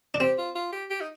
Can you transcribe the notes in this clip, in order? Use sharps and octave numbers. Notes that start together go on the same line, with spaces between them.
D4
C4 G4
F4
F4
G4
G4
D#4